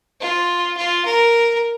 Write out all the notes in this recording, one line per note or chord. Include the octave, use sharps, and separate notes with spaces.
F4
F4
A#4